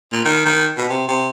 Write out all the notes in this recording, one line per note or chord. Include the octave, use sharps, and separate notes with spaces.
A#2
D#3
D#3
B2
C3
C3